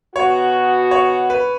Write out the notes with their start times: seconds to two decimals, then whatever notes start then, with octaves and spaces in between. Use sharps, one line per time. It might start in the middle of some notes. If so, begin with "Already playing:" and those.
0.15 B2 B3 F#4 C#5
0.91 C#5
1.30 B4